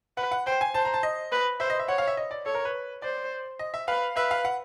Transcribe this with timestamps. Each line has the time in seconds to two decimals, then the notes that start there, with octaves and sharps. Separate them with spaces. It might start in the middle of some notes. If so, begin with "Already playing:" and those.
0.17 B4 F#5
0.31 F#5
0.46 C5 G5
0.61 G#5
0.74 C5 A5
0.85 A#5
0.94 A5
1.03 D#5
1.32 B4
1.60 C5 E5
1.70 D#5
1.79 E5
1.88 C#5 F#5
1.98 F5
2.07 E5
2.17 D#5
2.31 D5
2.46 A4 C#5
2.55 A#4
2.65 B4
3.02 C5 D5
3.59 D#5
3.74 E5
3.88 B4 F5
4.16 B4 E5
4.31 F5
4.45 F#5